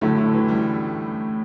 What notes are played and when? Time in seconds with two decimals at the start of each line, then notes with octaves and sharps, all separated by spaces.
0.01 A2 D3 F#3 A3 E4
0.18 D3
0.33 E3
0.48 G3